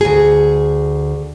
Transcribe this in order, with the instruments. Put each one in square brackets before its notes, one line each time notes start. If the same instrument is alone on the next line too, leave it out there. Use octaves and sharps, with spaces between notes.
[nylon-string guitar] D2 G#4